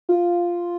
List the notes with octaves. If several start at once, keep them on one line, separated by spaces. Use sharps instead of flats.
F4